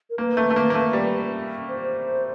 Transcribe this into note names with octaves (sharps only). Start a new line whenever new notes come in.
A#4
A#3 B4
A3
A3
A#3
A#3
A3
G3
C5